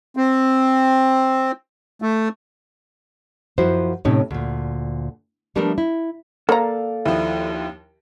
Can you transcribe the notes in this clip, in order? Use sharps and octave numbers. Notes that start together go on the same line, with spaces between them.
C4
A3
F#2 F3 E4 F#4 C5
A2 C3 C#4 D#4
D2 A#2
F3 G3 A3 B3 D4 A#4
E4
A#3 A4 D5 F5 A#5
D#2 F3 E4